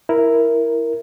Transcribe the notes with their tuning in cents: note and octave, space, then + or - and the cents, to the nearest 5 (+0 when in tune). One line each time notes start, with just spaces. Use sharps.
E4 +0 A#4 +0